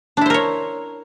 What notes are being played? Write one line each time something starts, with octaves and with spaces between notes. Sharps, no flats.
D4 E4 A#4 C5 C#5